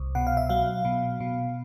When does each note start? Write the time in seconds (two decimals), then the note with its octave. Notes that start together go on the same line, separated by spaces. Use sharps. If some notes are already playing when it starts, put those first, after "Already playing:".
Already playing: C2
0.15 B2 F#5
0.27 F5
0.37 E5
0.49 F#3 F5
0.85 B2
1.20 B2